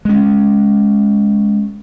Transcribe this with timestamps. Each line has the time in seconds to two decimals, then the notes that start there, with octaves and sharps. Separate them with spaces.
0.05 G#3 C#4